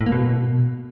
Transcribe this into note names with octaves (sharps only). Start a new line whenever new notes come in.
A2
A#3
B2